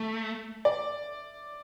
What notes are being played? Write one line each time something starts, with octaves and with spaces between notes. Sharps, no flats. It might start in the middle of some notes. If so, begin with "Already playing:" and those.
Already playing: A3 E5
D5